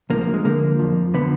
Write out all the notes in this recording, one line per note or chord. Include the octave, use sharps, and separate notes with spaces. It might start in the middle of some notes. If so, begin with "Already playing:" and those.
D2 D3 F3 A#3
A#3
G#3
D2 D3 F3 A#3
F2 F3
D3 F3 B3